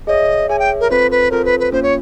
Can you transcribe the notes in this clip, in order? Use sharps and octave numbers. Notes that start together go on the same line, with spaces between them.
G#4 C#5 D#5 E5
G#4 C#5 E5 G#5
G5
A#4
C4 F4 A4 B4 C5
B4
C4 F4 A4 A#4 C5
B4
B4
A#3 C#4 F4 C5
C#5